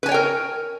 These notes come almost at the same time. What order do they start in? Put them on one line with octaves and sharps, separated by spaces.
B4 G#5 C#5 G5 A#4